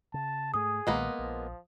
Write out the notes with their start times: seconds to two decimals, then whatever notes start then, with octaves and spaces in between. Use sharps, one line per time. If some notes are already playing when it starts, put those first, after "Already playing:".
0.14 C#3 A5
0.54 G#2 A3 G#4 D#6
0.87 B1 A#2 D#3 G#3 A#3 B3
1.19 A#1 F3